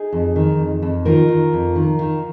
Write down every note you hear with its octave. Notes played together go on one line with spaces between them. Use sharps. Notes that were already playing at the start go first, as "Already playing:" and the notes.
Already playing: D#4 G#4
F2
D#3
F2
F2
D#3 F4 A#4
D#3
F2
D#3
D#3